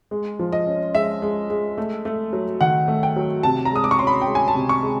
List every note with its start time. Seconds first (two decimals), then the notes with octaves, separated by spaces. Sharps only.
0.11 G#3
0.39 F3
0.52 D#5
0.66 C#4
0.94 G#3 E5
1.22 G#3
1.50 G#3
1.78 A3
2.05 A3
2.33 F#3
2.61 D#3 F#5
2.88 A3
3.03 G5
3.16 F#3
3.43 C3 A5
3.65 A#5
3.72 G#3 D#6
3.84 D6
3.91 C#6
3.99 C#4 C6
4.07 B5
4.22 G5
4.27 G#3
4.35 G#5
4.48 A5
4.55 C3
4.69 C#6
4.83 G#3